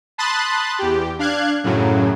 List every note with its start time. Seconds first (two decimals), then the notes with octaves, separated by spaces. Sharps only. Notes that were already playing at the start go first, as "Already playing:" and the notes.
0.18 A5 B5 C6 D#6 F#6 A6
0.79 E2 G4
1.19 D4 F5 F#6 G#6
1.64 F#2 A2 C#3 F#3